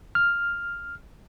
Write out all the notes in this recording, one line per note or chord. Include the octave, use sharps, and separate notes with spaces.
F6